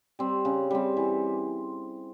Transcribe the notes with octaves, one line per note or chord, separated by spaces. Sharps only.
G3 C4
C#3
G3 C4
E3